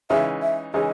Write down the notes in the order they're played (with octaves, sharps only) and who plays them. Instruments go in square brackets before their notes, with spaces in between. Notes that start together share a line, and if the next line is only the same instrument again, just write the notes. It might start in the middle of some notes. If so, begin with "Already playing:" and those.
[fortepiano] C#3 E3 G#3 D#4 [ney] E5
[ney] E5
[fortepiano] C#3 E3 G#3 D#4 [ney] D#5